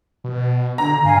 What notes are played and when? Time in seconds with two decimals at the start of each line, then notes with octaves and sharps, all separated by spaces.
0.24 B2
0.78 D3 A#5
1.04 G2 F5 G#5